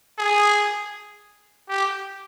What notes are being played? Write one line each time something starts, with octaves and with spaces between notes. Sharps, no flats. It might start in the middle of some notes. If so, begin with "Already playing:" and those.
G#4
G4